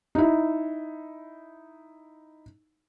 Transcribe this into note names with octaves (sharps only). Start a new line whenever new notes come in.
D#4 E4